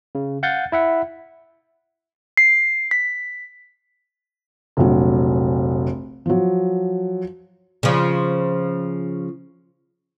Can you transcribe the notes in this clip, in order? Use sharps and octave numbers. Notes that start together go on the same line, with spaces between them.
C#3
F5 F#5 G6 A6
E4 E5 F#5
C7
B6
F1 A#1 F#3
F3 F#3
C#3 F3